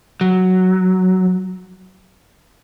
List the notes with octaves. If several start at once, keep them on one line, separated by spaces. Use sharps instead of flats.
F#3